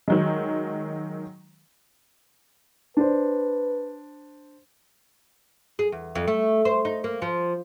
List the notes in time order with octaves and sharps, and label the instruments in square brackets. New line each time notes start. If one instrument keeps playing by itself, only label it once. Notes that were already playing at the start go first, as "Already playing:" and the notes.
[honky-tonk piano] D#3 F#3 G#3
[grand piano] D4 C5 [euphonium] B4
[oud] G#4
E2
F2
A3
C5
D#4
A#3
F3